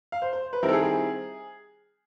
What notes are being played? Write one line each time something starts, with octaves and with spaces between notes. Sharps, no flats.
F5
C5
C5
B4
D#3 G3 C4 E4 A#4
A4
G#4
G#4